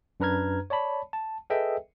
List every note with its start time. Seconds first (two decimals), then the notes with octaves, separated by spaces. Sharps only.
0.20 F#2 D4 B4 A#5 F6 G#6
0.70 C#5 D5 A5 B5
1.13 A5
1.50 G#4 A4 B4 D#5 E5 G5